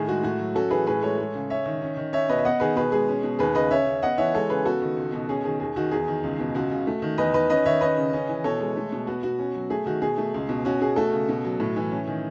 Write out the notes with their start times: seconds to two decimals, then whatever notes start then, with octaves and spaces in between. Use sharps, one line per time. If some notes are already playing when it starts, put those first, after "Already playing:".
Already playing: A2 D#3 G#4
0.08 G#3 F#4
0.23 A2 F#4
0.39 F#3
0.55 C#4 F#4 A4
0.71 E3 G#4 B4
0.87 A2 G#4 B4
1.02 G#3 A4 C#5
1.18 G#3
1.35 C#3
1.50 C#4 C#5 E5
1.66 D#3
1.82 C#4
1.97 D#3
2.13 C#4 C#5 E5
2.29 B2 B4 D#5
2.38 E5
2.45 B3 D#5 F#5
2.60 D#3 G#4 B4
2.76 B2 G#4 B4
2.92 G#3 G#4
3.08 C#4
3.23 B2
3.39 D#2 G#4 B4
3.55 C#3 B4 D#5
3.71 C#4 C#5 E5
3.86 C#3
4.03 B3 D#5 F#5
4.18 E3 C#5 E5
4.34 G#3 A4 C#5
4.49 C#3 G#4 B4
4.65 B3 F#4 A4
4.82 D#3
4.97 C#2
5.12 B2
5.29 C#4 G#4
5.44 D#3 G#4
5.60 D#2 G#4
5.76 D#3 F#4
5.91 E2 G#4
6.08 D#3
6.24 C#2
6.39 B2
6.55 C#2 F#4
6.71 C#3
6.87 A3
7.02 D#3
7.18 E2 B4 D#5
7.33 D#3 B4 D#5
7.50 C#4 B4 D#5
7.66 D#3 C#5 E5
7.81 C#4 B4 D#5
7.98 C#3
8.13 C#4
8.29 E3
8.44 B2 A4 C#5
8.60 G#3
8.76 A3
8.92 B2
9.07 B3 F#4
9.23 B2 F#4
9.39 C#4
9.55 F#3
9.70 A3 G#4
9.86 D#3 F#4
10.02 B2 G#4
10.18 A3
10.34 C#2
10.49 B2
10.65 C#4 F#4
10.82 B2 G#4
10.96 A3 F#4 A4
11.12 C#3
11.29 B2
11.44 F#3
11.60 A2
11.76 E3
11.91 C#4
12.08 D#3